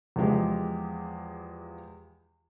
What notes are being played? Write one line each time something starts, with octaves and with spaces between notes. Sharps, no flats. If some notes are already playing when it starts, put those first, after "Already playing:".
E2 F3 G#3 G4